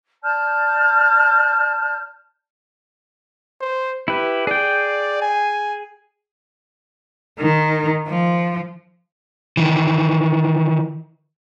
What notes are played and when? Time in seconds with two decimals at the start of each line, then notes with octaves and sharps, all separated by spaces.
0.22 D5 A5 F6 G6
3.61 C5
4.08 E4 G4 B4
4.47 G#4 D5 G5
5.22 G#5
7.40 D#3
8.08 F3
9.57 D#3 E3